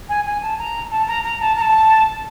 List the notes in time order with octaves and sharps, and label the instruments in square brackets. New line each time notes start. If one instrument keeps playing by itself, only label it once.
[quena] G#5
G#5
A5
A#5
A5
A#5
A#5
A5
A#5
A5